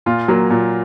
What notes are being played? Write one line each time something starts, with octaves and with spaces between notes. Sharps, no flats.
A#2 F4
F#3 A#3
A#2